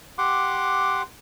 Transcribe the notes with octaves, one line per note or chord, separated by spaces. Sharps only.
G4 F#5 C6 D6